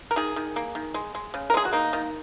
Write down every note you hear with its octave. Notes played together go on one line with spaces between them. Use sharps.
A#4
D#3 G#4
D#3
A#3
D#3
G#3
G#3
C#3
A#4
G#3 G#4
F#4
A#3 D#4
D#3